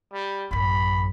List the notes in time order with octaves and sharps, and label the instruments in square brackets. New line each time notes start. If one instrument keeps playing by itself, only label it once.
[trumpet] G3
[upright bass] A1 F#2 [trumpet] B5